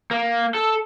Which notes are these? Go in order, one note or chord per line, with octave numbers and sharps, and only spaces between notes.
A#3
A4